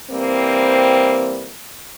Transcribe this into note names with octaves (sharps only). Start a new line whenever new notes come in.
E3 G3 A#3 C4